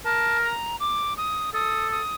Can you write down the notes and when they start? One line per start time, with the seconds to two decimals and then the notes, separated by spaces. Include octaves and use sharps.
0.04 A#4 A5
0.43 A#5
0.80 D6
1.17 D#6
1.54 A4 D#6
1.91 D#6